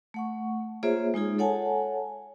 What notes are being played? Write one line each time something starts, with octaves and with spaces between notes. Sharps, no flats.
A3 F#5 C#6
A#3 F4 G#4 C5 C#5 E5
G#3 D#4 F4 G#4
A4 C#5 F#5 G#5 A5